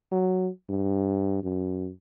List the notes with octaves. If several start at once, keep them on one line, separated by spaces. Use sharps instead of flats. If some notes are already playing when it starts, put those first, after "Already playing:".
F#3
G2
F#2